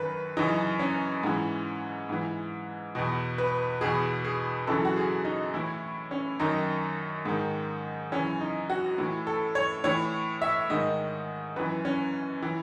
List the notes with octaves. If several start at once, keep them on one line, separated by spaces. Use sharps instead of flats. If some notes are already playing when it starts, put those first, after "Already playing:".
Already playing: F#2 D#3 B4
F#2 C#3 E3 D#4
C#4
G#2 E3
G#2 E3
E2 B2
B4
E2 B2 G#4
G#4
F#2 C#3 E3 A4
F#4
G#4
D#4
A2 E3 E4
C#4
F#2 D#3 D#4
G#2 D#3
F#2 C#3 E3 C#4
D#4
F#4
A2 E3
A4
C#5
A2 E3 C#5
E5
G#2 D#3 D#5
F#2 E3 B4
C#4
E3